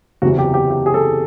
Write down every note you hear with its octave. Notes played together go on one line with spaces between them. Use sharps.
F#1 E2 C3 E3 F#4
G4
G4
G4
G#4
A4